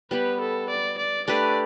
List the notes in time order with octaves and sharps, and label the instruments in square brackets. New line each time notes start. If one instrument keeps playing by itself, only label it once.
[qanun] G3 B3 G4 [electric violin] B4
[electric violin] A4
D5
D5
[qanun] A3 D4 G4 B4 [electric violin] D5